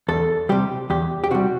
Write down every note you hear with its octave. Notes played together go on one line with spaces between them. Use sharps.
E2 A4
C3 G3 G4
E2 G4
G4
C3 G3 F#4